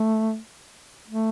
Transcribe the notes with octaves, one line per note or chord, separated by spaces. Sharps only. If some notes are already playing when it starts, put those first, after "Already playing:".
Already playing: A3
A3